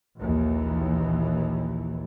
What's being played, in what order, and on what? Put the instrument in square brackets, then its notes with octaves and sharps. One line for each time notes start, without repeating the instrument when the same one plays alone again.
[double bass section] A#1 D#2 E3